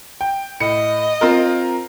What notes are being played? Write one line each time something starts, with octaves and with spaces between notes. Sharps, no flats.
G5
A2 D#5 C#7
C4 F4 A#4